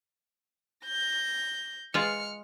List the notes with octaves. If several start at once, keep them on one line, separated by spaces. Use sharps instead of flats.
G6 A#6
G#3 F4 F6 C#7